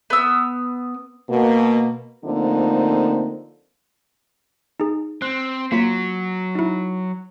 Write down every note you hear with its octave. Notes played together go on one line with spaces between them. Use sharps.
B3 E6
B2 A#3
D3 F3 A3 A#3 C4 D#4
D#4 G#4
C4 F#6
F#3 A#3 F4 B6
D#4 E4